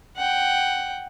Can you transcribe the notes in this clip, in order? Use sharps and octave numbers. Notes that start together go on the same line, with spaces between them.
F#5 G5